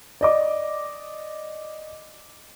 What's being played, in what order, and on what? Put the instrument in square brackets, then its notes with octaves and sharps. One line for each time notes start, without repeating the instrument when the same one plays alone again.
[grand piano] D5 D#5 D6